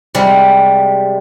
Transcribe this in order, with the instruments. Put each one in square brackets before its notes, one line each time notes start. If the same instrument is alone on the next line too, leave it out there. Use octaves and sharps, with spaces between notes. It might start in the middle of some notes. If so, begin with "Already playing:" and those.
[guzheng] C3 G3 G#3